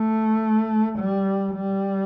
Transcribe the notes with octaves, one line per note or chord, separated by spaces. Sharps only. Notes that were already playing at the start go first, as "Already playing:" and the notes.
Already playing: A3
G3
G3